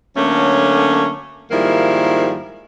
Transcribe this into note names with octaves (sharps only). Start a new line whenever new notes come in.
D3 F#3 A3 A#3 C#4
G#2 D#3 F3 G3 A#3 E4